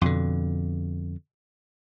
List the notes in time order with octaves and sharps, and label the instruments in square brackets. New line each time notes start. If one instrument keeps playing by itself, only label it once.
[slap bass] F2 B2 D3